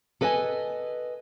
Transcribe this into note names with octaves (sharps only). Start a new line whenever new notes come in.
A4 B4 D#5 G5 G#5